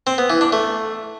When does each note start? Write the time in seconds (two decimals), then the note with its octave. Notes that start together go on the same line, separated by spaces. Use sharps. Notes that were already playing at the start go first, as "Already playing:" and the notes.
0.07 C4
0.18 B3
0.30 E3
0.41 D4
0.53 A3